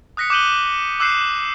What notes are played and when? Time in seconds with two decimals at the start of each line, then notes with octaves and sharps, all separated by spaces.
0.17 D#6 F#6 A#6 B6 C#7
0.30 D6 F#6 G6 D#7 F#7 G7
1.00 D6 E6 F#6 G6 C7 E7